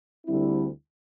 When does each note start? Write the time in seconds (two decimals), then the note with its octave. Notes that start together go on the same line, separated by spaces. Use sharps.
0.26 D2 D3 G3 C4 E4